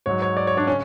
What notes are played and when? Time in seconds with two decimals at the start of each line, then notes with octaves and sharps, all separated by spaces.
0.06 G#2 F#3 C#5
0.22 C#5
0.37 D5
0.47 C#5
0.57 D4
0.67 C#3 C#4